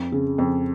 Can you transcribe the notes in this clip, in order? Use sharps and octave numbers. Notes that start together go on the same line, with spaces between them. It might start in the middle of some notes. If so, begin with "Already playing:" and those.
Already playing: F2
C#3
F2